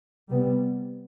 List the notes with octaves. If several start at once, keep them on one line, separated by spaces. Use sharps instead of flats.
C3 G3 B3